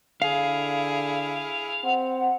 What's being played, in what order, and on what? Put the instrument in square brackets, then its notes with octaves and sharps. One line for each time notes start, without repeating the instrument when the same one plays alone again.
[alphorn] D3 [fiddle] E4 G#4 [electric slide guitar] F5
[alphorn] C4 [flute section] F#5